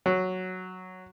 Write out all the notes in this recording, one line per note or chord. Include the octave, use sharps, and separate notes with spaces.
F#3